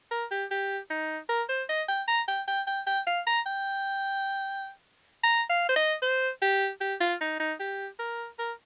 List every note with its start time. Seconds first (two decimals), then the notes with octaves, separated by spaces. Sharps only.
0.12 A#4
0.31 G4
0.51 G4
0.90 D#4
1.29 A#4
1.49 C5
1.69 D#5
1.88 G5
2.08 A#5
2.28 G5
2.48 G5
2.67 G5
2.87 G5
3.07 F5
3.27 A#5
3.46 G5
5.24 A#5
5.50 F5
5.69 C5
5.76 D#5
6.02 C5
6.42 G4
6.81 G4
7.01 F4
7.21 D#4
7.40 D#4
7.60 G4
7.99 A#4
8.39 A#4